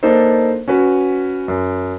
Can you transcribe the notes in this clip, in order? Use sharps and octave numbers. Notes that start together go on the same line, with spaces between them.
A#3 D4 D#4 A4 C5
C#4 F#4 B4
F#2